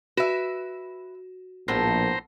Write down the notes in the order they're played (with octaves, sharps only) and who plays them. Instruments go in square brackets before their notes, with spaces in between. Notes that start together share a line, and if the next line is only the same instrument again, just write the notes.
[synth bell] F#4 [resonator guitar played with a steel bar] B4 E5
[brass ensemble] A#1 [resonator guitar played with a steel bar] A2 B3 [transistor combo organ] C5 A#5